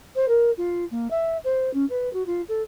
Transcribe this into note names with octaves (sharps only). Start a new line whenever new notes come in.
C5
A#4
F4
A#3
E5
C5
C#4
B4
F#4
F4
A4